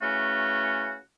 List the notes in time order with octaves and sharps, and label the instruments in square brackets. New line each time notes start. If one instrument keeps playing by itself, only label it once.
[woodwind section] C#3 E3 A3 C#4 F#4